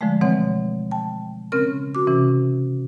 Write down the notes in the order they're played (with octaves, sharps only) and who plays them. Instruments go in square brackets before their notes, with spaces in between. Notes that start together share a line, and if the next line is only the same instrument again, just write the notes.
[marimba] D3 F3 G#3 A3
B2 E3 C4 C#5 F#5
G5 A5
C#3 C4 C#4 A#4 F6
F#4 D6
C3 E3 C#4